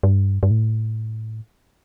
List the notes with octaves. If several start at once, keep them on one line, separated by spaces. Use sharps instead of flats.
G2
G2
A2